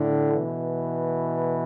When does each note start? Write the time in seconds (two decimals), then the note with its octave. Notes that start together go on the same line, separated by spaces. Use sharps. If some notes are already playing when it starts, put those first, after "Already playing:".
Already playing: A2 D3
0.33 B2 E3